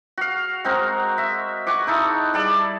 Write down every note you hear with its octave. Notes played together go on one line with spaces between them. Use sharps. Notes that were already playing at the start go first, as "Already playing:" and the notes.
F#4 F5
G#3 C4 F#4 A#4
E5
F#4 G#5 C#6 D6
D#4 E4 A4
G3 G#4 A4 D5